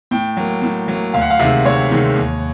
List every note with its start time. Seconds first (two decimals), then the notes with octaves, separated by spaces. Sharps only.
0.11 A2 G5
0.37 F#3 A#3
0.62 A2
0.88 F#3 A#3
1.14 D2 F5
1.21 F#5
1.30 F5
1.39 C3 D#3 G#3 E5
1.65 D2 C#5
1.90 C3 D#3 G#3
2.16 D#2